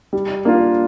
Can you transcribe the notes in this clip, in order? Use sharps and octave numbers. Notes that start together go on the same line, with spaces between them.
G3
A#3 D4 F4